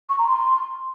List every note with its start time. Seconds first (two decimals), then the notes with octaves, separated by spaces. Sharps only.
0.09 C#6
0.18 A#5
0.28 C6